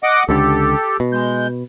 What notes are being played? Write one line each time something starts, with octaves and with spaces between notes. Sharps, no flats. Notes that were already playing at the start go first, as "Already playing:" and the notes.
D#5 F#5 D6
C#2 D3 G4 A4
B2
G#3 G6